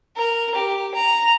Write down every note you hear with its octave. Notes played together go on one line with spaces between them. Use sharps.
A#4
G4
A#5